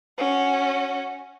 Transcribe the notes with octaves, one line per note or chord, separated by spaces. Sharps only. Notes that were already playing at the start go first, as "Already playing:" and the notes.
C#4 F#4